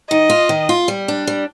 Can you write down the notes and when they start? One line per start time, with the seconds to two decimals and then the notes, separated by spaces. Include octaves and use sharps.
0.10 D#3 D#5
0.30 F4
0.49 D#3
0.69 F4
0.88 G3
1.08 D4
1.27 G3